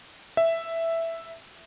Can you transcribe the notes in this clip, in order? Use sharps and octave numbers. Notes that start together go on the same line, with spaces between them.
E5